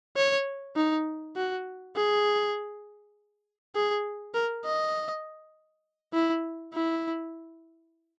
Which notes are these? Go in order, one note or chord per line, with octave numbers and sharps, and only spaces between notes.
C#5
D#4
F#4
G#4
G#4
A#4
D#5
E4
E4